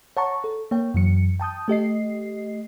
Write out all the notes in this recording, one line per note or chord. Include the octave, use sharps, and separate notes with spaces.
C#5 F#5 A5 A#5 C#6
A4
A#3 C#5 G5
F#2 E3 F#3 C#7
G5 A5 D#6 G6
A3 G4 D#5 C7